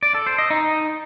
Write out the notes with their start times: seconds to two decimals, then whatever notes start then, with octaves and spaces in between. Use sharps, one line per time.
0.03 D5
0.15 A4
0.26 C5
0.38 D#5
0.50 D#4